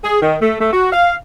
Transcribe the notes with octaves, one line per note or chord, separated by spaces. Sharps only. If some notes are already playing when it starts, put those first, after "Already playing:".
G#4
D#3
A3
A3
F#4
F5